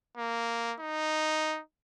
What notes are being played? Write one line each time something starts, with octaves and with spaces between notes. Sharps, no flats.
A#3
D#4